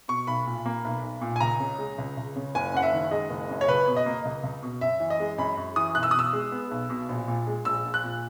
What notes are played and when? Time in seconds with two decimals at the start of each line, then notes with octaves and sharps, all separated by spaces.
0.08 B2 C#6
0.27 B1 B5
0.46 A#2
0.66 A#3
0.85 B1
1.03 B1
1.21 A#2
1.36 G#5
1.40 C#2 A#5
1.60 C#3
1.79 G#3
1.98 C#2
2.17 C#2
2.36 C#3
2.55 F#1 G#5
2.74 F#2 F#5
2.82 E5
2.93 D#3
3.11 G#3 D#5
3.30 F#1
3.49 F#2
3.61 C#5
3.68 C#2 B4
3.88 B2
3.97 D#5
4.06 A#3
4.25 C#2
4.43 C#2
4.63 B2
4.81 F#2 E5
5.00 E3
5.10 D#5
5.20 G#3
5.38 F#2 B5
5.57 F#2
5.76 E3 D#6
5.95 B1 F#6
6.03 E6
6.11 D#6
6.14 B2 E6
6.33 G#3
6.52 B3
6.71 B1
6.90 B2
7.09 A#1
7.28 A#2
7.47 G#3
7.65 A#1 E6
7.85 A#1
7.94 F#6
8.04 A#2